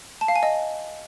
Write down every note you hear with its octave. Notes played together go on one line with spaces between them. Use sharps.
A5
F5
G#5
D#5